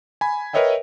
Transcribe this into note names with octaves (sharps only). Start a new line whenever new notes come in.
G#5 B5
A#4 B4 C#5 D#5 E5 G5